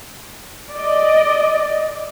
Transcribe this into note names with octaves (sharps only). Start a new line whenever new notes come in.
D5 D#5